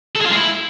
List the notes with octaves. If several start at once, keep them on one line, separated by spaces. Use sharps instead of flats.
A4
G#4
F4
G#3
E4